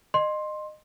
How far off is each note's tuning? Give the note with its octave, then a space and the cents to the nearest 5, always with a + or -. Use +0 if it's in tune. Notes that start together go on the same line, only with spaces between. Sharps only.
D#5 -25 C6 +10